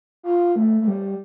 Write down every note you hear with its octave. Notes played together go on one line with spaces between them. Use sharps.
F4
A3
A3
G3